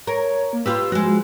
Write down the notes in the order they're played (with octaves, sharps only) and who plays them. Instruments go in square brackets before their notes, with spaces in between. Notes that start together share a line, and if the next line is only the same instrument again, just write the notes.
[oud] A#4 [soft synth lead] C#5
[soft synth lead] A#3
[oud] F4 G4 B4 [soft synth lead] E6
[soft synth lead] F3 [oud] G#3 F#4